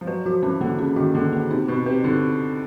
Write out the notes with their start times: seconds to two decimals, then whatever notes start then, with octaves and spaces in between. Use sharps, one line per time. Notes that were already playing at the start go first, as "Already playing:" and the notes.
0.01 F3
0.07 F#3 B4
0.25 F3 F#4
0.43 E3 C#4
0.61 D3 A#3
0.79 C#3 C#4
0.96 D#3 F#4
1.15 D3 A#3
1.32 C#3 A#3
1.50 C3 D#4
1.68 B2 B4
1.86 C3 B4
2.04 D3 D#4